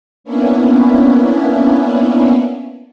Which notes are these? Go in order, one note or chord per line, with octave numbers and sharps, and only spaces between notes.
A#3 B3 C#4 D4 E4